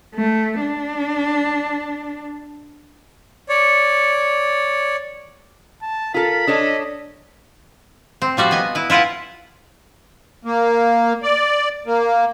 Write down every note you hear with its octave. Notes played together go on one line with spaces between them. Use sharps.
A3
D4
C#5 D5
A5
F4 A4 A#4 B5
D4 A4 C#5 D#5
C4
F3 G3 F#4 C5
B3 D#5 G#5
E4 B4
E4 F4 B4 F#5 G#5
A#3
D5
A#3